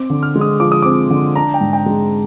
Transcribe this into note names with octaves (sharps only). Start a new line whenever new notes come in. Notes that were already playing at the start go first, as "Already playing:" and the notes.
Already playing: C4 D6
D3
F6
G#3
D#6
F3 D6
D#6
C4 D6
D3
D4 A#5
G5
G#2
G5
G#3